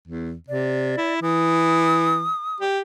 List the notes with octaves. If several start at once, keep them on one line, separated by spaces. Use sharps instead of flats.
E2
C3 D5
E4
E3 D#6
G4